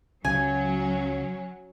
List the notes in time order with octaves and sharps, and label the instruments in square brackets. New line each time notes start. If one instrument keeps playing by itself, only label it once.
[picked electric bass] C#2 C#3 [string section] F#3 C#4 [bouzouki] G#5